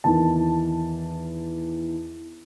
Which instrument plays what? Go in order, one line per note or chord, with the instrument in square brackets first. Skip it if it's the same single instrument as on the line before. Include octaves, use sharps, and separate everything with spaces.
[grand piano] E2 D#3 A5